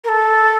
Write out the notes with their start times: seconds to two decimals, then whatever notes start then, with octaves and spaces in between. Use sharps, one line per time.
0.04 A#4
0.08 A4